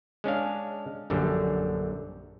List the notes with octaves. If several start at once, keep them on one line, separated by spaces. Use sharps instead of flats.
G#3 C#4 D4 F5
A#1 F#2 D3 G3